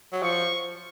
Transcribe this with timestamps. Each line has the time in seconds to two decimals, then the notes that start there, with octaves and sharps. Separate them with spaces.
0.13 F#3
0.22 F3 C#6